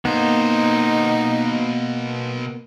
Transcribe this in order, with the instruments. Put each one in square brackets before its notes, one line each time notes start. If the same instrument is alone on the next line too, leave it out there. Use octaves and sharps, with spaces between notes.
[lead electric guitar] B2 C5 [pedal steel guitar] A#3 B3 [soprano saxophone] D#4